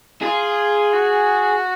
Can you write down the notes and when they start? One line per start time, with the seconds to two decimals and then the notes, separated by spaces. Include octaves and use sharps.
0.21 F4 G#4
0.94 F#4